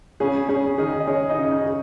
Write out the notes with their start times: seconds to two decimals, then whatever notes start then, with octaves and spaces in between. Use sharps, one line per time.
0.20 C#3 C#4 G#4
0.49 C#3 C#4 G#4
0.78 D#3 D#4 G#4
1.00 D#5
1.07 C#4 G#4 C#5
1.29 D#4 D#5
1.37 C#3
1.51 D#4 D#5
1.66 G#4